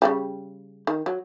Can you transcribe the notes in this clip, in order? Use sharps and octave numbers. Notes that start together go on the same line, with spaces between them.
C#3 F#3 G3
D#3
F#3